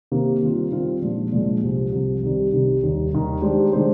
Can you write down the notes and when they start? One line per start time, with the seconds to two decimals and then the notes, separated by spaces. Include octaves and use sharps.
0.12 C3 D#3 A#3
0.43 D#3 G3 C4 F4
0.72 D#3 G3 C4 F4
1.02 A#2 F3 G#3 D4
1.32 A#2 F3 G#3 D4
1.63 C2 C3 F3
1.92 C2 C3 F3
2.23 C2 C3 D#3 G3
2.52 C2 C3 D#3 G3
2.83 D#2 D#3 G3
3.12 D#2 D#3 G3
3.42 D#3 G#3 D4 G4 C5
3.73 D#3 G#3 D4 G4 C5